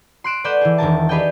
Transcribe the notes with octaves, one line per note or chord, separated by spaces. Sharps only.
C6 F#6 D7 E7
A3 B4 D5 F#5 G6 E7
E3 G#4
E1 D#3 A#4 A5
G4 G#4 B4 D5 D#5 G5